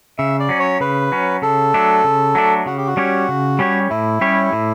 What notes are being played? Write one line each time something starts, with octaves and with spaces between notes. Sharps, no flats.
C#3 E5
D5
F#3 C#4
C#5
C#3 B4
F#3 C#4
C#3 A4
F#3 A3 D4
C#3
F#3 A3 D4
C#3 F#4
G4
F#4
G3 C#4 G4 C#5
C#3
G3 C#4 G4 C#5
A2 E4
G3 C#4 G4 C#5
A2